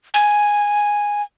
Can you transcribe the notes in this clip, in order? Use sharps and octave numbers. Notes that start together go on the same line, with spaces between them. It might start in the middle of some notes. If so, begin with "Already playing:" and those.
G#5